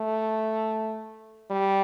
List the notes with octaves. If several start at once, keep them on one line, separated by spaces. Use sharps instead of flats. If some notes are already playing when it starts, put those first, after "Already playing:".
Already playing: A3
G3